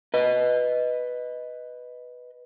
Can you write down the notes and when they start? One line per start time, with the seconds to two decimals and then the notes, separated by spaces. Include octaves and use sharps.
0.14 B4 D#5